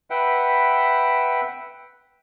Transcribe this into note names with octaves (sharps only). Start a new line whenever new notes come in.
B4 E5 F#5 G5